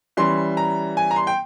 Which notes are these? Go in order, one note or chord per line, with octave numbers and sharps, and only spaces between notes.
E3 G3 C#4 C6
A#5
G#5
A#5
C6
G5